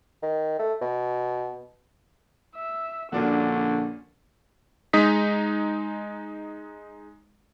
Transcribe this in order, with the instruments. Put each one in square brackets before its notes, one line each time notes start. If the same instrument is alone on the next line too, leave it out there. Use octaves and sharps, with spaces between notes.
[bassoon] D#3
A3
B2
[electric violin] E5
[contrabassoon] A#1 [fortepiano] A#2 D4 F#4 [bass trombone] D3 [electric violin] C#4
[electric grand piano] G#3 D#4 D#6 B6